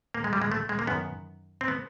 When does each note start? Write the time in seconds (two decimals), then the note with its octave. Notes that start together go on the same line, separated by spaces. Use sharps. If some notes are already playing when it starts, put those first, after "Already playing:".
0.14 A#3
0.24 G#3
0.33 G3
0.42 G#3
0.52 A3
0.69 G#3
0.79 A#3
0.87 F#2 D#3 B3
1.61 C4
1.68 B3